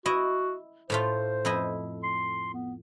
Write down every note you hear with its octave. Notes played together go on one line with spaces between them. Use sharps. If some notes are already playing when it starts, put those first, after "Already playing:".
E4 F#4 D#5
A2 A3 F4 C5
F2 E4 D#5
C6
B3